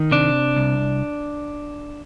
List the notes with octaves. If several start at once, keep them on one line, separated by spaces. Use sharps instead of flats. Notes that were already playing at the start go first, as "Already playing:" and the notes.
Already playing: D#3
C3 D4
C2